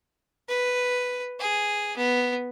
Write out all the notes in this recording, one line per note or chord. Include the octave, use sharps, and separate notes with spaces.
B4
G#4
B3